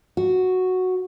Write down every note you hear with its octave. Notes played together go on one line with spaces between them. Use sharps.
F#4